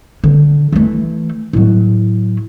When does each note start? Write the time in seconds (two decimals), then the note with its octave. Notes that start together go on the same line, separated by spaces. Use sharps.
0.24 D3
0.72 E3 A3
1.53 A2 F#3